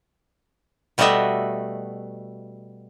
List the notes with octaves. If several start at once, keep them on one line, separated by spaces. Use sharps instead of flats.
B2 G3 A3 F#4 D#5 E5